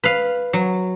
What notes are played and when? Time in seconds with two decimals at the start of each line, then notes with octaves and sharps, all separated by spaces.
0.04 B4 F5
0.53 F#3